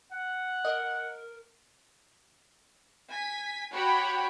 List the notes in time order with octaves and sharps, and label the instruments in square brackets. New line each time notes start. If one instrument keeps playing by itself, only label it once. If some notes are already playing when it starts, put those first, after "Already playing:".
[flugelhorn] F#5
[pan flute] A#4 [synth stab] D#5
[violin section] G#5 B6
F#4 G4 C#5 F#5 G5 B5